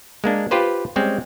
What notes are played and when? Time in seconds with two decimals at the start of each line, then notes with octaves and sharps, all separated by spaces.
0.24 G#3 A#3 D4
0.51 F4 G4 B4 C5
0.96 G3 G#3 C4 C#4